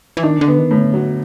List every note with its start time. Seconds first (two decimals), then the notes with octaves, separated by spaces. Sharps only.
0.17 E3
0.23 D#3 D4
0.41 D3
0.48 B3
0.58 D#3
0.71 A2
0.77 D3
0.94 F#3